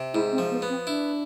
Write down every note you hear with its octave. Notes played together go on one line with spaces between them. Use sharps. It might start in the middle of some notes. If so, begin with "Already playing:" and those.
Already playing: C3
G#2 E4
C4
F3
B3
B3
C4
D4 E4